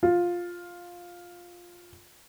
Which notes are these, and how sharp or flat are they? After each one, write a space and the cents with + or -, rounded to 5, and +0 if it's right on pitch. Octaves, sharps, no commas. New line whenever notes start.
F4 +5